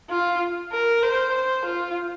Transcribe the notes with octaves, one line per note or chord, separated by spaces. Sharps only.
F4
A#4
C5
C5
F4